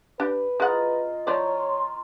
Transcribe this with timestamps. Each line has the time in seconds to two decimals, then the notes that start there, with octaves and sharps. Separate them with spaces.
0.20 D4 G4 B4
0.60 G#3 F4 D#5 F#5 A#5
1.27 F3 C#5 D5 A#5 C6 C#6